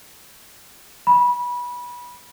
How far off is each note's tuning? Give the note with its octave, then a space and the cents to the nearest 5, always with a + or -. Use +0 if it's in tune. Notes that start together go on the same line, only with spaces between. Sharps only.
B5 -25